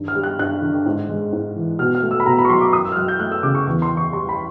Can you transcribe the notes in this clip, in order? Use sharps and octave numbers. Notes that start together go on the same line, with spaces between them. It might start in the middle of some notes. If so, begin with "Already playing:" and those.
Already playing: G2 D#3
F6
G3
F#6
G2 F#6
D3
G#2
G#3
G#2
E3
B2 F6
F6
A3
E6
B5
B2 A#5
B5
C#6
F#3 C6
D6
F#2 D#6
E6
F6
F#3 F#6
G6
A3 F#6
E6
C#3 D6
C#6
E2 C#6
C6
E3
C#6
G3 C6
B5